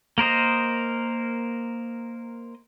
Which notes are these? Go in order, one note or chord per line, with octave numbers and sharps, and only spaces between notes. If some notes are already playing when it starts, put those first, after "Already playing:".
A#3 A#4 C5 D#5